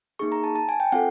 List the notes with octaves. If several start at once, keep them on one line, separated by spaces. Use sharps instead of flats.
A#3 D#4 G#4 C#6
A#5
A5
A5
G#5
G5
C4 F4 A4 F#5